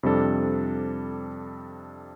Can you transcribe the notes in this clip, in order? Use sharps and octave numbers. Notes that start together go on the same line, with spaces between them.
F2 C3 G3 D4 A4